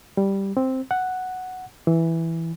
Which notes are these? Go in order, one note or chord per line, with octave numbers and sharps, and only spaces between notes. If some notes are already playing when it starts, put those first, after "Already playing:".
G3
C4
F#5
E3